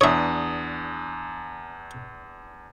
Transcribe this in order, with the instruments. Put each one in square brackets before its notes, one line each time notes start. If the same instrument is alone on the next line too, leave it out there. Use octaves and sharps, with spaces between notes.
[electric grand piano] E2 D4 D#6 [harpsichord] C#5 E5